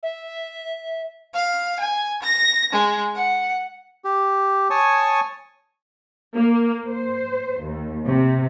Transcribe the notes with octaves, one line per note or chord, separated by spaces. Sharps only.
E5
F5
G#5
A#6
G#3
F#5
G4
C#5 G#5 A5 C#6 D#6
A#3
C5
D#2
C3